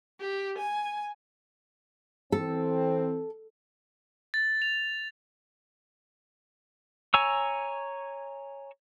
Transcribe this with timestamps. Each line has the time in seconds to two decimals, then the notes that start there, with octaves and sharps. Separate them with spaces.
0.20 G4
0.58 G#5
2.32 E3 C4 A4
4.34 A6
4.62 F7
7.14 C#5 G#5 A#5 C#6 E6